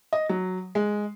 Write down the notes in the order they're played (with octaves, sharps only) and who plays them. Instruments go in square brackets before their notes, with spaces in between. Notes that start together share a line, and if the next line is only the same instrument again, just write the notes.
[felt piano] D#5
F#3
G#3